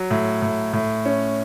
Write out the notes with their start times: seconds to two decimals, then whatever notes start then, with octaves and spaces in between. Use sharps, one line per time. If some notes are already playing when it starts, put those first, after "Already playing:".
Already playing: F#3
0.11 A2
0.42 A2
0.73 A2
1.05 C#4